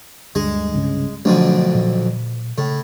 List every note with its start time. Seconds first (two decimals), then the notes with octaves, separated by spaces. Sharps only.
0.35 D2 G2 D3 G#3
0.74 C2 G2 C#3
1.25 B1 F2 D3 A3 D4
1.75 A#2
2.58 A2 C#3